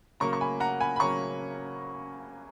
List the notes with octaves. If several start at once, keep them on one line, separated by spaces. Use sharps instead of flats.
C#3 F#3 A#3 A#5 C#6
C#6
G#5 B5
F#5 A#5
G#5 B5
B5
C#3 F#3 A#3 A#5 C#6